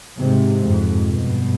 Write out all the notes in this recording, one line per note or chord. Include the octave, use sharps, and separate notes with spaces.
G#2 C3
F2 G#2
G2 B2